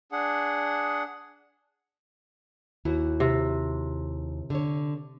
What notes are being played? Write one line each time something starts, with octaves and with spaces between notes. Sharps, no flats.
D4 G#4 F#5
D#2 E4 F#4
C3
D3 C#5